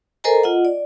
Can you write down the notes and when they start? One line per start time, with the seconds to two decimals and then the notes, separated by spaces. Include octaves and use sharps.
0.24 A4 A#4 C5 D#5 G#5 A#5
0.43 F4 D#5 F#5
0.65 D5